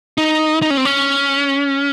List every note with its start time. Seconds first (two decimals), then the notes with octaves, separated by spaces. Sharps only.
0.18 D#4
0.62 D#4
0.70 C#4
0.77 C4
0.85 C#4